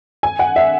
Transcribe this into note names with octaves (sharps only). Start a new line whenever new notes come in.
G#5
F#5
E5